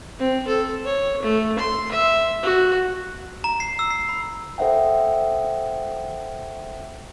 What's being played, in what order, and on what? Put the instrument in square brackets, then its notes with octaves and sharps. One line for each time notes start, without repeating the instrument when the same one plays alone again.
[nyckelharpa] C4
A4
C#5
A3
C6
E5
F#4
[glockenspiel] A#5
C7
E6
C7
B5
[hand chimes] A4 C5 E5 F#5 G5